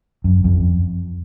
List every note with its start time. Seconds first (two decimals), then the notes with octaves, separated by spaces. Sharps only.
0.24 F#2
0.44 F2